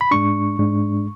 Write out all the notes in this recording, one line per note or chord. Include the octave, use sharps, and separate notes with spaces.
B5
G#2 G#3 D4 C#6
G#2 G#3 D4